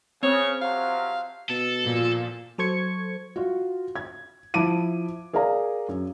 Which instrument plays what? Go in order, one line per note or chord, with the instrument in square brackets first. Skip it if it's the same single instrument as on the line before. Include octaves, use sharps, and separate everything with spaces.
[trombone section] C#3 [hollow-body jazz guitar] C4 [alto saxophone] C#5
[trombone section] C3 F3 F#3 [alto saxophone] F5
[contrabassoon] B2 [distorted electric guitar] A4
[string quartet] A#2 F3
[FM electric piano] F#3 A4 C5 C#6 G#6 C#7
[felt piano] F4 F#4
G#6
F3 E4 A5 D6 D7 D#7
G#4 A#4 D5 F5 A#5
F#2